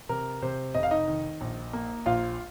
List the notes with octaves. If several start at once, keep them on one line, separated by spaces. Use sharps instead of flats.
C3 A#4
C3 C5
F1 D#5
F5
D#4 D#5
D#3
A#1
A#3
A#1 F4 F5